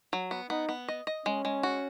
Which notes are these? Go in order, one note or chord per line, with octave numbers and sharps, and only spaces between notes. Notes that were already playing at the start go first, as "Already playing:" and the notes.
F#3
B3
B3 D#4
B3
D#5
D#5
G#3 C#4
G#3
F#4